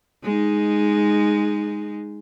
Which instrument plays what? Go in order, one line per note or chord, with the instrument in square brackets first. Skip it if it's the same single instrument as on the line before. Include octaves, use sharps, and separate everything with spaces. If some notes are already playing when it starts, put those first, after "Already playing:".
[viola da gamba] G#3 D#4